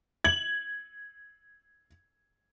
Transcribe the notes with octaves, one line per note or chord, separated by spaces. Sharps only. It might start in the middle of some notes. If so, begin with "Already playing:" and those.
G#6 F#7